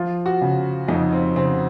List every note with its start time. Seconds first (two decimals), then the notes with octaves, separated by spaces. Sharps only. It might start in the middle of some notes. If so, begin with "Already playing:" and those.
Already playing: F3 F4
0.26 F#4
0.41 C#3
0.88 F2 D#4
1.13 C4
1.36 C#3 C4